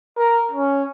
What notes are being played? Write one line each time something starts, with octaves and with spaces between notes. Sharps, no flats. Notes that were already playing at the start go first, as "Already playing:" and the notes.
A#4
C#4